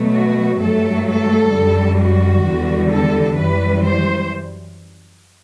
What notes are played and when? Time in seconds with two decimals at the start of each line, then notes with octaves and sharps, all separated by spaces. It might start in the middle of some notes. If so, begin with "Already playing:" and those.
Already playing: B2 F#3 A3
0.14 F#4
0.60 G2 F#3 A3 A4
1.07 A4
1.52 F#2 D3 G3
1.99 F#4
2.44 E2 D3 G3
2.91 A4
3.36 F#2 E3 G3 B4
3.83 C5